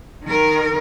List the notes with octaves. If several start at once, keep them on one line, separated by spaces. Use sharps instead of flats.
D#3 A#4